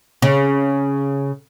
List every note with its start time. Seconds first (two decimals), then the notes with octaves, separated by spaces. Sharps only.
0.22 C#3